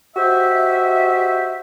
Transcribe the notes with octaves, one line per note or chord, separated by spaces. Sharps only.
F#4 G4 C5 D#5 E5